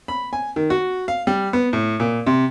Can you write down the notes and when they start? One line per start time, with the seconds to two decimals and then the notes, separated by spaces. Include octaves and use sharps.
0.08 B5
0.33 G#5
0.56 D#3
0.70 F#4
1.08 F5
1.27 G3
1.53 B3
1.73 A2
2.00 A#2
2.26 C3